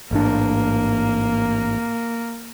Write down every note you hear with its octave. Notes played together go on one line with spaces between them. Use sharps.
A1 G#2 A#3 D4